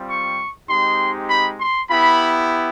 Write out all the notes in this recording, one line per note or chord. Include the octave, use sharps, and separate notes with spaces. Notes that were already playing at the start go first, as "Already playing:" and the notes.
Already playing: G3 C4 F4
C#6
G#3 C4 D#4 G4 C6
B5
C6
B3 E4 G4 B5